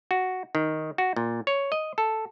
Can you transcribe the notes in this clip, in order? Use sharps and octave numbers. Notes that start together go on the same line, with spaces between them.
F#4
D#3
F#4
A#2
C#5
D#5
A4